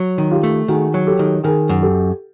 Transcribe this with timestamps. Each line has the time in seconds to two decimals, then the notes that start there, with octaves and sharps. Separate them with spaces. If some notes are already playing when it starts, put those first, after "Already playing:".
Already playing: F#3
0.18 D#3
0.31 F4 G4
0.43 A3
0.68 D#3 F#4 G#4
0.94 F#3
1.07 G4 A4
1.19 D#3
1.44 D#3 G#4 A#4
1.69 F#2
1.82 G4 A4